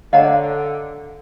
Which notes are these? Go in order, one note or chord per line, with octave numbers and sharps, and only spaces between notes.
D3 C#5 D#5 F5 F#5 A#5